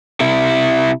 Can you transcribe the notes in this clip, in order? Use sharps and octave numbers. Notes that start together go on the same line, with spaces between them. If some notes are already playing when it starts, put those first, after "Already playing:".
C3 E4